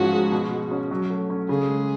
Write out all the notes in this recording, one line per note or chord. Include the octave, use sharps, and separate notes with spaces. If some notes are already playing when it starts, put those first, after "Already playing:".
Already playing: G#2 F3 C#4 F#4
G#3
B2
G#3
C#4
F#3
A3
C#4
C#3 G#4
G#3